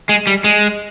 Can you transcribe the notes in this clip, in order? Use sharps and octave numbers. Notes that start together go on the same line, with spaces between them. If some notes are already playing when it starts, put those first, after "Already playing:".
G#3
G3
G#3